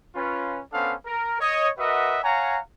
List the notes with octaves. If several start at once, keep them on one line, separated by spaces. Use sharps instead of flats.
C#4 F4 B4
B3 C#4 D4 A4 C5 F5
A#4
C#5 D#5
F#4 A#4 B4 D#5 E5 F#5
C#5 F5 F#5 G#5 A#5